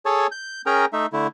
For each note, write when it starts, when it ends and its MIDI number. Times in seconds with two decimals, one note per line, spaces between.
0.06 0.27 68
0.06 0.27 69
0.06 0.27 73
0.06 0.27 81
0.32 0.62 91
0.66 0.85 61
0.66 0.85 68
0.66 0.85 70
0.66 0.85 79
0.66 0.85 82
0.93 1.06 57
0.93 1.06 63
0.93 1.06 76
1.13 1.27 50
1.13 1.27 57
1.13 1.27 64